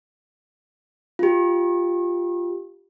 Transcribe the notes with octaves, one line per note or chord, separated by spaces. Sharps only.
F4 G4